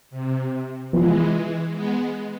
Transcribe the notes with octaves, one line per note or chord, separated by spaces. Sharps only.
C3
E3 F3 G#3 B3 F4
G#3 B3